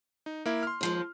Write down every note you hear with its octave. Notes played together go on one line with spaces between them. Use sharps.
D#4
A#3 E4
C6 F6
D#2 F3 G#3